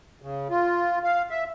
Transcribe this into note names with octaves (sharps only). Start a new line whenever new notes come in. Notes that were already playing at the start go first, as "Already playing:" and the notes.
C#3
F4
F5
E5